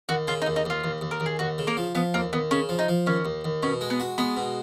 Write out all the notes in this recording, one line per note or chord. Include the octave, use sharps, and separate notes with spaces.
D#2 F#4
C#3 F4
D#4
D#2
D#4
D#2 F4
D#2
D#2
A#4
D#2
G#4
D#2 F#4
C#3
A#3 A#4
F3
F3 B3
D#2 A#3
D#2 B3
C#3 C#4
F3
D#4
F3
D#2 C#4
D#2
D#2
B2 C#4
G#3
B3
F#4
G#3 B3
B2